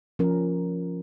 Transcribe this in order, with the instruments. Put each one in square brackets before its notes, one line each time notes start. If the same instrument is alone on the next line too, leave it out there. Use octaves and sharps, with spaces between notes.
[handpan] F3 C#4 A#4